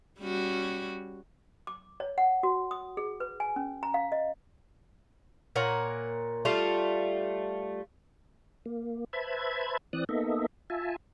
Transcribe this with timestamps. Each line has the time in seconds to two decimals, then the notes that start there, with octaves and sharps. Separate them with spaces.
0.20 G3 C#4 F#4
1.67 D6
2.00 C#5
2.18 F#5
2.43 F#4
2.71 D#6
2.97 G#4
3.20 B4
3.40 G#5
3.56 C#4
3.83 A#5
3.94 F5
4.12 D#5
5.56 A#2 A#4 C#5 F#5
6.45 G3 A3 F4
8.66 A#3
9.13 B4 C5 E5 A5 B5 G#6
9.93 E3 C4 D5 D#6 F#6
10.09 A#3 B3 D#4 A4 D#5 E5
10.70 F4 E5 G#5 A5